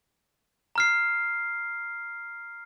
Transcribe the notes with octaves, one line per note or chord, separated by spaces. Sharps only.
A#5 F6 C7